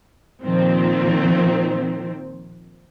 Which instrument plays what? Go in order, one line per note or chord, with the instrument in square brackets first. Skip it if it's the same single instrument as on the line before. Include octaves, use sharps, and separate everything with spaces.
[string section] A#2 D#3 F3 C4